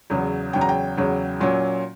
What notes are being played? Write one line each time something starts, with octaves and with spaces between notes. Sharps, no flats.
E2 C#3 F#3
E2 C#3 F#3 G5
A#5
G5
E2 C#3 F#3
A#2 F#3 C#4